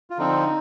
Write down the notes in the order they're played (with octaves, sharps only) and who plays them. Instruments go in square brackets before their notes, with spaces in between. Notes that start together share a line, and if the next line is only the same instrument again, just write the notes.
[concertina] F4
[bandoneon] D3 F3 C4 [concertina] D#4